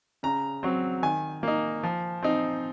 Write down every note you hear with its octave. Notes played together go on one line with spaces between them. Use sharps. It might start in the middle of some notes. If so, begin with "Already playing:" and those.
C#3 A#5
F#3 C4
D#3 G#5
A#3 D#4
F3
C4 D#4